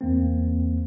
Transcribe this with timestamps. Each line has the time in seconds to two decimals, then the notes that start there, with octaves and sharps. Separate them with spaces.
0.01 E2 A#3 C4